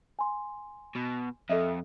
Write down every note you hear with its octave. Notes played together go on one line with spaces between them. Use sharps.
G#5 C6
B2
F2 A4 D#5 E5